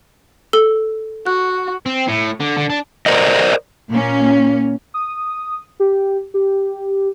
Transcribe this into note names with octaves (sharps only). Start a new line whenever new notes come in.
A4 E6 G7
F#4 F#6
C4
A2
D3
D3
D4
A#4 C5 D5 D#5
A#2 A#3 C#4
D#6
G4
G4